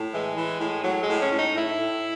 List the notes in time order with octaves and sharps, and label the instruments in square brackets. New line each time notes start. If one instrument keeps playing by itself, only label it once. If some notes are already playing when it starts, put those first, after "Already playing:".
Already playing: [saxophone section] A2
E3 G#3
E3
A2
A2 F#3
G#3
A2
C#4
A2
D#4
A2 E4
A2